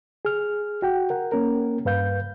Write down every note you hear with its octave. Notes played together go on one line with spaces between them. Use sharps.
G#4 F6
F#4 F#5 G5
A#4 F#5
A#3 C#4 A#4
G2 B4 F5 G6